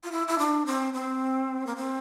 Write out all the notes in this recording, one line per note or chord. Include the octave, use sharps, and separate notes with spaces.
F4
E4
E4
D4
C4
C4
A#3
C4